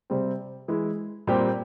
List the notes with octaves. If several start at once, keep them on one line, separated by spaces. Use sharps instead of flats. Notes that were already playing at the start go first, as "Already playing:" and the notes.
C3 G3 C4
E3 G#3 E4
A#2 G3 C4 G4